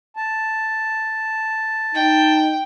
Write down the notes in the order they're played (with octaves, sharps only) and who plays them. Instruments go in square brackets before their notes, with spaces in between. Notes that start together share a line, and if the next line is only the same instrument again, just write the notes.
[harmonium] A5
[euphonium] D#4 [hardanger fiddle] G5